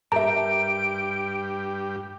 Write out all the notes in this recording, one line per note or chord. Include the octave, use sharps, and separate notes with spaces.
G2 G4 A#4 E5 A5 A#5 D7